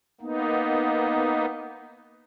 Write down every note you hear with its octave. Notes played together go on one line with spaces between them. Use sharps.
A#3 B3 D#4